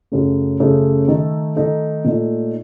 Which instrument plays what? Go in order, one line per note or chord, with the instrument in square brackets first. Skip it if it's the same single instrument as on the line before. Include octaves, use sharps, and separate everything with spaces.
[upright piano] F#2 C#3 A3
F#2 C#3 A3
D#3 A3 D#4 A4
D#3 A3 D#4 A4
A#2 A3 D#4